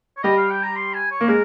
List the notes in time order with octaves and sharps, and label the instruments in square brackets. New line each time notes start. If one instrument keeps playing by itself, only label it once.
[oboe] C#5
[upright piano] G3 G4 [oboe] D#5
[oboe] F5
G5
A#5
C6
G#5
C#5
[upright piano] A#3
[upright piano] G#3 [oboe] A#4